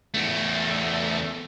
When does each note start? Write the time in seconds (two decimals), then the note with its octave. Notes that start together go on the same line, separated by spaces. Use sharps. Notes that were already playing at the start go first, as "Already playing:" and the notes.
0.14 E2 A3